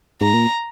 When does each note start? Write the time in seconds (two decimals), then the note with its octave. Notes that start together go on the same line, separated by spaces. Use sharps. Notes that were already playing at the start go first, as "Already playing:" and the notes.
0.21 G#2 A#5
0.34 A#2